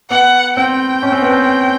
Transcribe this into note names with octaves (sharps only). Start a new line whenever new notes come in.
B3 F#5
C4 G5
C#4
C4
B3
C4